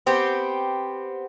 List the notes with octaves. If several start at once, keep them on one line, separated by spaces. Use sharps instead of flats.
B3 C4 G4